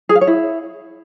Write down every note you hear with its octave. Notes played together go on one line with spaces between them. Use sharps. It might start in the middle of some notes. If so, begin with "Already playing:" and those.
G#4
F5
C#5
E4